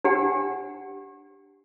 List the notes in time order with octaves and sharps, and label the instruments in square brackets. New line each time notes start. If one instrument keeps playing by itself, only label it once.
[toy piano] D4 G4 F#5 G5